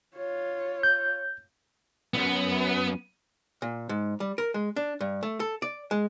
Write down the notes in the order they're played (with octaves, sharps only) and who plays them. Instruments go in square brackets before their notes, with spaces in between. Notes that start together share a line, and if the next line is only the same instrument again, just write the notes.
[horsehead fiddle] F4 C#5
[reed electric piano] G6
[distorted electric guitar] B1 F#2 [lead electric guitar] B3
[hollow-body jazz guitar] A#2
G#2
G3
A#4
G#3
D4
G2
A3
A4
D5
G#3